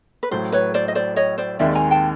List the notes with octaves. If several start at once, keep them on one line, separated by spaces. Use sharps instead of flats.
B4
A1 A2 F#3 A3 C5
B4 C#5
C5 D5
D#5
C5 D5
C#5 D#5
C5 D5
D#2 D#3 G#3 C4 D5 E5
G#5 A#5
G5 A5